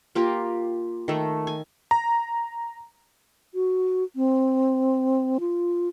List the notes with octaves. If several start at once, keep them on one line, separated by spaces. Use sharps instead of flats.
A#3 F4 G4 A#4
D#3 A3
G#5
A#5
F#4
C4
F4